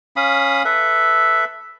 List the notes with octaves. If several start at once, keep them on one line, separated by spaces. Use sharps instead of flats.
C#4 F5 B5 D#6
A4 B4 E5